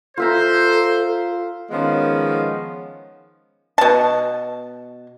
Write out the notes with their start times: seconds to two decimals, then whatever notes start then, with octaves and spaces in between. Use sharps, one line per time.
0.18 F4 A4 C5 E5 A#5
1.71 D#3 F3 G#3 B3 C#4
3.78 B2 A5